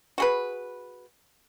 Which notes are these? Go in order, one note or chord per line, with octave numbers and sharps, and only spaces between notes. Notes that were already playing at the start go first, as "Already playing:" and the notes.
F#4 G#4 B4